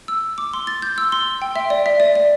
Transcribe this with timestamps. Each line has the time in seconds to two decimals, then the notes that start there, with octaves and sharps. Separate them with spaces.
0.08 E6
0.38 D6
0.53 C6
0.67 A6
0.82 G6
0.98 E6
1.12 C6
1.42 G5
1.56 E5
1.70 D5
1.86 E5
2.00 D5
2.15 D5